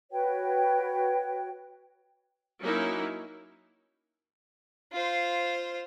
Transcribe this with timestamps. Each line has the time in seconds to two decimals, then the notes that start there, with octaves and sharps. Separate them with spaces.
0.12 F#4 B4 C#5 G5
2.62 F#3 A#3 C#4 D#4 E4
4.92 F4 C5